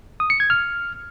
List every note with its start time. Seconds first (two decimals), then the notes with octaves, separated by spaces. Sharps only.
0.20 D#6
0.30 C#7
0.40 G#6
0.50 F6